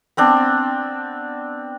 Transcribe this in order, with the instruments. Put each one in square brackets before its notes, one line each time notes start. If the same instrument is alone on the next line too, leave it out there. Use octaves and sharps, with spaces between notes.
[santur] B3 C4 D4